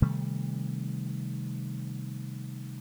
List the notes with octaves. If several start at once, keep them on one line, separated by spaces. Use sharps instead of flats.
C3 D#3 G3 A3